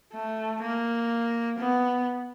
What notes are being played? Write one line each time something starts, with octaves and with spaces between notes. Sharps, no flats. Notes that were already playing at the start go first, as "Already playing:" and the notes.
A3
A#3
B3